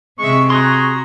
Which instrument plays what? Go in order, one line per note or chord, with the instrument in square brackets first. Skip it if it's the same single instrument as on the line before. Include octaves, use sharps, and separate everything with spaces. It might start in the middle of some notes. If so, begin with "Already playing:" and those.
[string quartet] C3 [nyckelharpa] G#3 E5 [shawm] C#6
[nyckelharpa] F#4 A#5 [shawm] G#4 [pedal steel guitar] C6 C#6 F#6